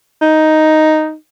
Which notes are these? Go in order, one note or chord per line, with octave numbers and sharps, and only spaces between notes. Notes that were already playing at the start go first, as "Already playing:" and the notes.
D#4